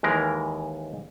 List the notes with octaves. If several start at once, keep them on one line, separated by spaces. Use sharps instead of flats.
D#2 E3 G#3 A#4 A#5